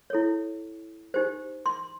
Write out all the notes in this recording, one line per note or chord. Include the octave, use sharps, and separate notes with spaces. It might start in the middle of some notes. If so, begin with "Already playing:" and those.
E4 A4 C#5
D#4 G4 C5
C6